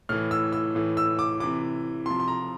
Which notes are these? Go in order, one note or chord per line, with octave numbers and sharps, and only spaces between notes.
A2 E3 F6
E6
E6
A2 E3
E6
D6
C3 E3 D6
C3 F3 C6
C6
A#5